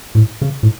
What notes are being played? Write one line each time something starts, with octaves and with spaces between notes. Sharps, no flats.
A2
C#3
A2